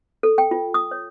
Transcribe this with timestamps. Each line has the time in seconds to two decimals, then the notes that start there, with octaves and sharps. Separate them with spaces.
0.23 A4
0.38 G5
0.51 F4
0.74 D#6
0.91 C#5